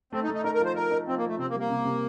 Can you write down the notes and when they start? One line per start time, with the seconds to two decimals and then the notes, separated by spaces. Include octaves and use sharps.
0.13 A3 C4
0.23 D#4
0.29 A3
0.34 D#4
0.44 D#4 A#4
0.54 A#4
0.60 F3
0.65 C5
0.75 D#4 A#4
0.91 D#4
1.07 F3 C4
1.18 A#3
1.23 F3
1.28 A3
1.39 C3 C4
1.49 A#3
1.54 G3
1.60 A#3
1.70 C3
1.85 C3